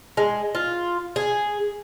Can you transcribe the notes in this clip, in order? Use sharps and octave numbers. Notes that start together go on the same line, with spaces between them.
G#3
F4
G#4